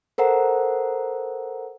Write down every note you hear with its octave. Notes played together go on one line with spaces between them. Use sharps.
A4 A#4 C5 F#5 A#5